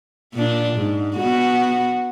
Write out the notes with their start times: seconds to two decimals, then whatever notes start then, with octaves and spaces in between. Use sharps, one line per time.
0.34 A#2 D4
0.77 G#2
1.17 B3 F#4